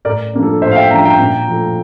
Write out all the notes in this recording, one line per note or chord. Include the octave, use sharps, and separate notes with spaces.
A2 A#4 D5
F3 A#3 D4
A4
A2 C5 E5
F5
E5 G5
F3 A#3 D4 G5 A#5
G5 A#5
A#2
F3 A3